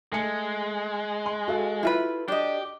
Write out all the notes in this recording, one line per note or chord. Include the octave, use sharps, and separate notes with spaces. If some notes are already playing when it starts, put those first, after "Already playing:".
G#3 A3 G#5 C#7
C6
F#4 A4 F5
E4 F4 B4
D4 G4 D#5